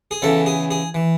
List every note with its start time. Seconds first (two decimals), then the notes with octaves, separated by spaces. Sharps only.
0.11 G#4
0.22 E2 C#3 E3 A4
0.46 G#4
0.71 G#4
0.94 E3